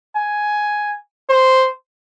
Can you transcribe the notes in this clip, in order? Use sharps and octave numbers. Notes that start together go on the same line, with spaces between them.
G#5
C5